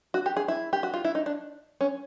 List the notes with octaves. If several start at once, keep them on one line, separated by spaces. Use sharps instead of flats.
F#4
G4
G#4
E4
G4
F#4
F4
E4
D#4
D4
C#4